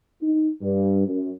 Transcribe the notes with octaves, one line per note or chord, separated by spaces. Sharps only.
D#4
G2
F#2